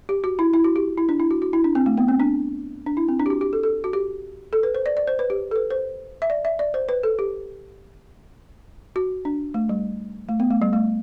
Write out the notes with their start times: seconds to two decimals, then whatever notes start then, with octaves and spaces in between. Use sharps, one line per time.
0.09 G4
0.24 F#4
0.39 E4
0.53 E4
0.64 F#4
0.76 G4
0.98 E4
1.09 D4
1.20 E4
1.31 F#4
1.42 F#4
1.53 E4
1.64 D4
1.75 C4
1.86 A3
1.97 B3
2.08 C4
2.20 D4
2.86 D4
2.97 E4
3.08 C4
3.19 D4
3.26 G4
3.30 F#4
3.41 G4
3.53 A4
3.63 A4
3.84 F#4
3.93 G4
4.53 A4
4.63 B4
4.75 C5
4.86 D5
4.97 D5
5.07 C5
5.19 B4
5.30 G4
5.51 A4
5.56 B4
5.70 C5
6.22 E5
6.30 D5
6.45 E5
6.59 D5
6.74 C5
6.89 B4
7.03 A4
7.19 G4
8.96 F#4
9.25 D4
9.54 A3
9.69 G3
10.29 A3
10.40 B3
10.51 A3
10.62 G3
10.73 A3